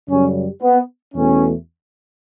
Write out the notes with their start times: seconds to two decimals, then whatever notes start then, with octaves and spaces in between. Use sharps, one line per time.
0.09 F#2 C#3 G3 C#4
0.62 B3
1.14 E2 B2 A3 C#4